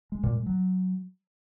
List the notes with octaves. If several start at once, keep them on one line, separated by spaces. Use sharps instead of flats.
G#3
A#2
G#3
F#3